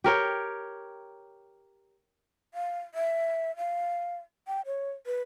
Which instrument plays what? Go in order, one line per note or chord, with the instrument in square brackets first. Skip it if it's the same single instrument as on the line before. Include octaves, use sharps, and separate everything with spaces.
[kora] G4 A#4 C#5 G5
[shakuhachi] F5
E5
F5
G5
C#5
B4